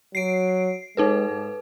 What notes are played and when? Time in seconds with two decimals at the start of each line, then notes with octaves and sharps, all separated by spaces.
0.15 F#3 C7 D7
0.97 G#3 D#4 A4 B4
1.29 G#2